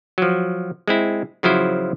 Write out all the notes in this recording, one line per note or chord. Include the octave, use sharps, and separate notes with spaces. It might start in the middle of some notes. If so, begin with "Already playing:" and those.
F3 F#3
G#3 C4 E4
C#3 F3 F#3 E4 C5